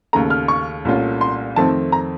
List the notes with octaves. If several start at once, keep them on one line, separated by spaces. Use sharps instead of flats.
D#2 C#3 A3 A#5
F6
C#6
C2 A#2 A3 C#4 F4
C6
F2 D#3 A3 C4 A5
A#5